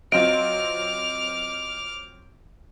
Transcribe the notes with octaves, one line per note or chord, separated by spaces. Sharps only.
F#3 C4 F4 D#5 D6 F6 D7